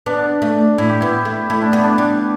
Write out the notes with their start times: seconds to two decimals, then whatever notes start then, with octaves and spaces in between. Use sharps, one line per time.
0.06 B3 D4
0.42 A3
0.78 A2 E4
0.89 G4
1.00 B3 E4
1.25 A3
1.50 A3 E4
1.62 D4
1.72 A3 B3
1.83 D4
1.98 G3